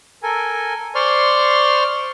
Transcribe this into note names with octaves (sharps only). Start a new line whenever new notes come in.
A4 A#4 G#5
C5 D5 C6 C#6 F6